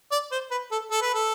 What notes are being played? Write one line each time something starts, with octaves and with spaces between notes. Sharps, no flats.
D5
C5
B4
A4
A4
B4
A4